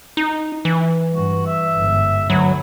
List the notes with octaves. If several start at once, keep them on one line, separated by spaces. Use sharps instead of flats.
D#4
E3
G2 F#4
E5
G1 G#2
D2 F#3 B3